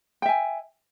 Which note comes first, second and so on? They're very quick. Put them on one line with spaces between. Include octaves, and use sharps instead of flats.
G5 E5 G#5